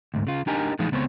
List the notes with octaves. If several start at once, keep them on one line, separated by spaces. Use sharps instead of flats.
D2 G#2
C#3 F4
D4 D#4 G4 A#4 D#5 G#5
A2 E3 F3 G#3 D#4 F4
C#2 B3 C4 C5 C#5